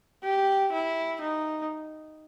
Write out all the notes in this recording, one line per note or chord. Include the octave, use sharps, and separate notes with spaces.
G4
E4
D#4